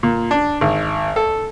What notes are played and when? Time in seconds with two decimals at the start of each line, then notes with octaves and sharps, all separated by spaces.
0.03 A#2
0.31 D4
0.61 G#1
1.16 A4